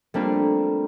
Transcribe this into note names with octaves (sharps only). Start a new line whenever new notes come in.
G3 A3 A#3 C4 D4 F4